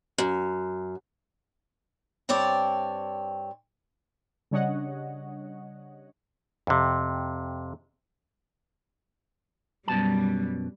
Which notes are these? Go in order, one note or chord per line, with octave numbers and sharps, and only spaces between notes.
F#2
G2 C4 C#5 D5 A5
C#3 G3 D4 C#5 D#5 F#5
F2 C3
F#2 B2 G3 A5